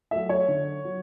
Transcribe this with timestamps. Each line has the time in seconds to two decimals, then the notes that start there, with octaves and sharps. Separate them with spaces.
0.11 F#3 A3 E5
0.29 C#5
0.48 D3
0.85 F#3